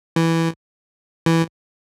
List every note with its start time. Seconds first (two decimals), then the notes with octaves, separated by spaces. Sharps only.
0.16 E3
1.26 E3